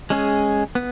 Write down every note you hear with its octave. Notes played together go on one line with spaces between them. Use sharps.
G#3 C#4 G#4
B3